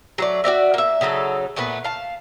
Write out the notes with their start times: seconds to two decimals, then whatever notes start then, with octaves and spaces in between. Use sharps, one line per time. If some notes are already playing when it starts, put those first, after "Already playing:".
0.18 F#3 A3 D5
0.44 F#4 A#4 D5 E5
0.74 A#3 E5
1.01 C#3 F#3 D#4 A4
1.56 A#2 A3 B3 B4
1.84 F5 A5